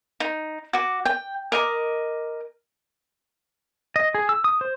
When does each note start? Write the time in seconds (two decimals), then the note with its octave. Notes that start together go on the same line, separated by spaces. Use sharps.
0.20 D#4
0.73 F#4 D6
1.05 G5
1.52 A#4 D#5 D6
3.96 D#5
4.14 G#4
4.29 E6
4.44 D#6
4.61 C5